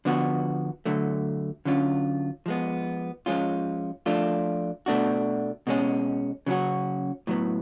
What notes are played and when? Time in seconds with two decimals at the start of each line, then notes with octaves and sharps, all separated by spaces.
0.05 D3 F3 B3 F#4
0.86 D3 F#3 A3
1.65 D3 F#3 C#4 F4
2.46 F3 G#3 B3
3.26 F3 G#3 C#4 F4
4.06 F3 A3 D4 F4
4.86 B2 A3 D4 F#4
5.67 B2 G#3 C#4
6.46 C#3 F#3 C#4 F#4
7.27 A2 F#3 B3